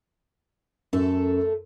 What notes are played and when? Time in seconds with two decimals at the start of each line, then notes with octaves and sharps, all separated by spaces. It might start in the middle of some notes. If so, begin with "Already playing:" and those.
0.93 F#2 A3 A4